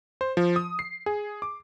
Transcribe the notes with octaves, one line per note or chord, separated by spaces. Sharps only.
C5
F3
D#6
C7
G#4
D6